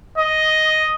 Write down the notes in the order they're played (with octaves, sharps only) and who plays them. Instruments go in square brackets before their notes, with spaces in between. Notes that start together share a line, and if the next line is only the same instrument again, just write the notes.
[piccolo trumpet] D#5